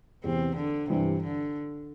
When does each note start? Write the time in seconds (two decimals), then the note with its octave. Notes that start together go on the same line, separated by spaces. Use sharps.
0.24 E2 C3 E3 C4
0.56 D3
0.89 G2 C3 E3 G3
1.23 D3